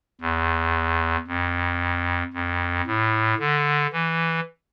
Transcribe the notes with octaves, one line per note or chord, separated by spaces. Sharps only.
E2
F2
F2
A2
D3
E3